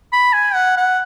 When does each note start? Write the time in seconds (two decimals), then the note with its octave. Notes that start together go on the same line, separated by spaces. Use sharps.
0.13 B5
0.33 G#5
0.55 F#5
0.77 F#5